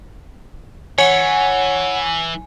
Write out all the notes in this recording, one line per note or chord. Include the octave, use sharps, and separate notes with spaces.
E3 C#5 F#5 G#5